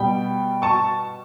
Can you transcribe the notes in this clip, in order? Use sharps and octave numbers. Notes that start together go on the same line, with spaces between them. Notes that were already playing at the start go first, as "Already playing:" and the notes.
Already playing: B2 G3 G5 B5
A5 C#6